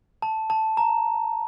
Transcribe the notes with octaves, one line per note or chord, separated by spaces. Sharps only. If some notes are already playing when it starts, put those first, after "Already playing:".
A5
A5
A#5